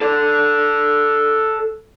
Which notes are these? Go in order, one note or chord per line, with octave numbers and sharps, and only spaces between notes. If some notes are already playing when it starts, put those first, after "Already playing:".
A4 D5